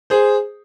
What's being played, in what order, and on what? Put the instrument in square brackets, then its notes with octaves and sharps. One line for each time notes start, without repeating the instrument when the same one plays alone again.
[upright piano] G#4 C5